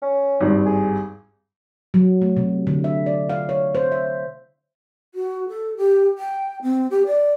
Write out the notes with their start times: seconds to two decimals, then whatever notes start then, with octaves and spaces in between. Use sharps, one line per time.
0.02 C#4
0.40 G#1 G2
0.66 G#4
1.94 F#3
2.22 A3
2.37 C3
2.67 D3
2.84 E5
3.06 D5
3.29 F5
3.49 C#5
3.75 C5
3.92 E5
5.15 F#4
5.49 A4
5.77 G4
6.18 G5
6.62 C4
6.91 G4
7.06 D5